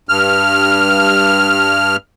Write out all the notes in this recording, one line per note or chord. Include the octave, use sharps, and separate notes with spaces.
G2 F6